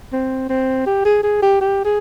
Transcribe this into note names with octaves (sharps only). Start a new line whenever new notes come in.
C4
C4
G4
G#4
G#4
G4
G4
G#4